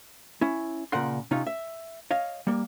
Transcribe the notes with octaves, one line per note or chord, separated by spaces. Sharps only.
C#4 E4
A#2 C#3 A#4 F#5 C6
C3 C#4 D#4 F4
E5
C#5 D#5 F5
G3 A#3